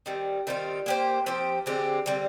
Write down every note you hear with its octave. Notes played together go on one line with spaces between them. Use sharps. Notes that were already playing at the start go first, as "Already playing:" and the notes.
D#3 G3 C4
D#3 G3 C4 F4
A#3 D4 G4 C5
F3 C4 G4 C5
D3 G#3 C4 G4
D3 G3 C4